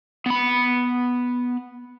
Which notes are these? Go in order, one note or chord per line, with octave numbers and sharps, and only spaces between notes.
B3 B5